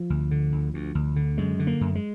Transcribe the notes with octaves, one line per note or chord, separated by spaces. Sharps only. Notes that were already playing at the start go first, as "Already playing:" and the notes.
Already playing: F3
D2
D3
D2
D2
D2
D3
F#2 G#3
D3
A#3
F#2
G#3